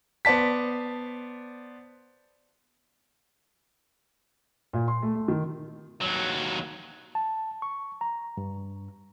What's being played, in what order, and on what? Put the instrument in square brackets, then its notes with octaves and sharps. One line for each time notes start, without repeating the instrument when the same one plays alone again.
[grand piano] B3 C5 D5 A5 B6
A#2
C6
A3
A3
D#3
[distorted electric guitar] D#2 F#3
[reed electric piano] A5
C#6
A#5
G2